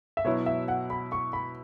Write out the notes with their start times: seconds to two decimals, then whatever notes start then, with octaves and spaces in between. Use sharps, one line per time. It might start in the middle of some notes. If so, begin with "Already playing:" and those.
0.17 E5
0.24 B2 F#3 E4 C#5
0.46 E5
0.68 F#5
0.90 B5
1.12 C#6
1.33 B5